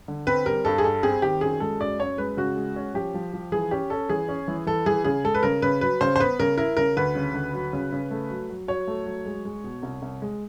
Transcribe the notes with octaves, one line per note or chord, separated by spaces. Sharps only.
D3
C4 B4
G3 A#4
G2 A4
G#4
G3 A4
C4 G#4
D#3 G4
F#2 G#4
G#3 A4
F#2 D5
F#2 C#5
G#3 B4
C#3 F#4
G#3
C#4
F3 G4
F3
F3
E3 G#4
C#4 G4
C#4 A4
E3 G#4
C#4
E3
E3 A4
E3 G#4
C#3 G#4
G#3 A4
B4
C#3 A#4
C#3 B4
F#3 B4
C#3 C5
C5
B3 B4
C#3 A#4
E4 A#4
C#3 A#4
D2 B4
C#3
D2
F#3
C#3
C#3
A3
F#3
F#3
F#3 C#5
A3
F#3
G#3
G#3
B2
C2
C2
G#3